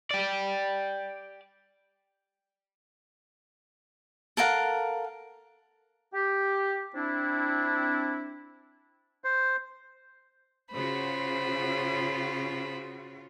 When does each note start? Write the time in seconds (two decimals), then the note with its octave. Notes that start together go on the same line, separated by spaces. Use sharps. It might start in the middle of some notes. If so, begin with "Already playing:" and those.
0.11 G4 D5
4.37 A4 A#4 F5 F#5
6.13 G4
6.95 C4 D4 E4
9.24 C5
10.72 C#3 F4 F#4 C5 B5